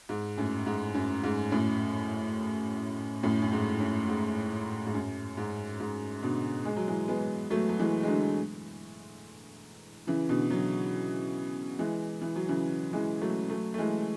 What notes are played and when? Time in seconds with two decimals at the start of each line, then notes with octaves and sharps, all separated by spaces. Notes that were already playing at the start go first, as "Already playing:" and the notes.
0.09 G#2
0.37 F#2 A2
0.66 G#2
0.94 F#2
1.24 G#2
1.51 F#2 A2
3.23 F#2 A2
3.42 F#2
3.52 G#2
3.80 F#2
4.08 G#2
4.86 G#2
4.94 F#2
5.37 G#2
5.80 G#2
6.22 B2 D3
6.65 G#3
6.77 F#3
6.88 E3 G#3
7.08 G#3 B3
7.50 F#3 A3
7.69 F#3
7.79 E3 G#3
8.03 G#3
8.08 D3 F#3
10.07 C#3 E3
10.29 B2 D3
10.50 D3 F#3
11.79 E3 G#3
12.22 E3
12.36 F#3
12.49 C#3 E3
12.93 E3 G#3
13.21 F#3 A3
13.49 F#3 A3
13.74 A3
13.78 E3 G#3